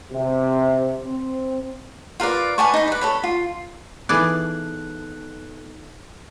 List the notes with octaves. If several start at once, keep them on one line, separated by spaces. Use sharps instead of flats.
C3
C4
F4 A#4 B4 D5
B4 G#5 A5 C#6
D#4 B5
B4 D5
A4 C#5 B5
F4
E3 B3 D#4 G#4 A4 D5 F#6